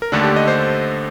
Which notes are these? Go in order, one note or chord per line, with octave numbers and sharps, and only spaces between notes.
A#4
D#2 D3 A3 D4 A4
G4
D#5
C5